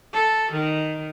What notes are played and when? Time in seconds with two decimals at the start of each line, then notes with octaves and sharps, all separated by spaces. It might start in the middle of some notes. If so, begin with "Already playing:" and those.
0.12 A4
0.52 D#3